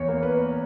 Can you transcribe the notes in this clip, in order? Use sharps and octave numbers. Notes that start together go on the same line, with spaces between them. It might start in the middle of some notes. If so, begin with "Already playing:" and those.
Already playing: E2 C#5
A#3
B4